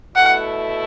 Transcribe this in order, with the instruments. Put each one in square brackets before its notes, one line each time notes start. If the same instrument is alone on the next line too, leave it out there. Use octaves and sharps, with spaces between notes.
[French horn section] B2 A3 E4 [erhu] F#5